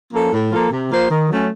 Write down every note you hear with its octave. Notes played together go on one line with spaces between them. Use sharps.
F3 A#3 C#4 A4
A2
F3 A#3 F4 A4
C3
F3 A#3 F4 C5
D#3
F#3 A3 C#4